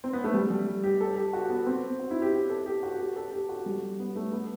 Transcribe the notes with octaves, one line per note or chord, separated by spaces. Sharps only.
C4
B3
A3
G3
G3
G4
A4
G4
F#4
B3
C4
F#4
E4
G4
G4
A4
G4
F#4
G4
A4
G4
F#4
G3
B3
A3
B3